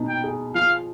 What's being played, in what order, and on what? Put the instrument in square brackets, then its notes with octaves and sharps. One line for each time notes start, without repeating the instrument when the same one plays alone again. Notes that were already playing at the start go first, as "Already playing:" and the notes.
Already playing: [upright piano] B2 D#4
[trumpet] G5
[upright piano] G#4
[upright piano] F3 [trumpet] F5